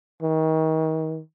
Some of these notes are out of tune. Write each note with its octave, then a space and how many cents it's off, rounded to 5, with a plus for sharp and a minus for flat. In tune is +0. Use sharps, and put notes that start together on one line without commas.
D#3 +35